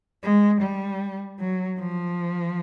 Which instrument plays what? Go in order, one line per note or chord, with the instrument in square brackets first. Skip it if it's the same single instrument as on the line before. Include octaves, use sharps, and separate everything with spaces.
[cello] G#3
G3
F#3
F3